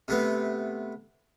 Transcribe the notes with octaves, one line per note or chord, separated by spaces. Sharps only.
C3 A3 B3